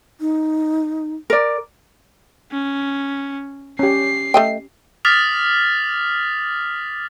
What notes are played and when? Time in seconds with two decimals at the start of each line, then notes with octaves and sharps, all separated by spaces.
0.21 D#4
1.30 A#4 D5
2.52 C#4
3.79 C#4 G4 C7
4.34 A3 D#5 G5
5.05 D6 D#6 F6 A6 B6 F7